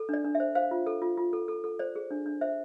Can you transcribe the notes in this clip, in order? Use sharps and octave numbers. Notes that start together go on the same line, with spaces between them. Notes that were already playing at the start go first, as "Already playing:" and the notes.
Already playing: A4
D4 D5
D4
E5
C5
C5 F5
F4
A4
F4
F4
A4
A4
A4
C5 D5
G#4
D4
D4
C5 E5